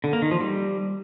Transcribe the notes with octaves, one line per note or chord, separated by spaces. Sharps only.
D3
A#3
D#3
F3
G3